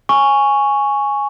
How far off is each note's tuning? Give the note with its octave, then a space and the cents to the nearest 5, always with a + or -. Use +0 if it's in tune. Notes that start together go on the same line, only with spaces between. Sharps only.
G#5 +0 C#6 +0